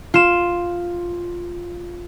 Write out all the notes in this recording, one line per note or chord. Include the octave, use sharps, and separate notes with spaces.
F4 E7